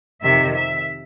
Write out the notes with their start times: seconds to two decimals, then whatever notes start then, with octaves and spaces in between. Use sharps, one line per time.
0.22 F2 C3 D#3 E5
0.57 E5